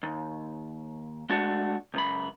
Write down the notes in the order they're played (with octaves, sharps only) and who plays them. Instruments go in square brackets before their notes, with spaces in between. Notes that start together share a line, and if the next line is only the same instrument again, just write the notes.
[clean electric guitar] D#2
G#3 A3 D4 F#4
C#2 F#2 B5